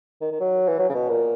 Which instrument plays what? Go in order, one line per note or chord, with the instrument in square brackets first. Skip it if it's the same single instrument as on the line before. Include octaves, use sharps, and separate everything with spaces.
[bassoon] D#3
D#3
F#3
E3
F#3
C#3
B2
A#2